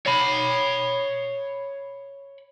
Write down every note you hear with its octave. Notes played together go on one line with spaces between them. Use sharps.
C#5 B5